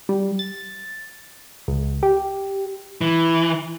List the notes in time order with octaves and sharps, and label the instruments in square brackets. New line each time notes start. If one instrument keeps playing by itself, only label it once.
[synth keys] G3
A6
C#2
G4
[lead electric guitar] E3